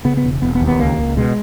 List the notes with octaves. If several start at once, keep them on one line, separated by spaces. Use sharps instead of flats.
C#3 B3
B3
E1
E1 B3
B3
D#2
B3
C#2 A#3
C#2
B2 G#3